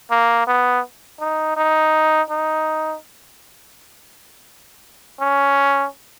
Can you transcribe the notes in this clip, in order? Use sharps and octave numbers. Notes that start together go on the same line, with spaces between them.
A#3
B3
D#4
D#4
D#4
C#4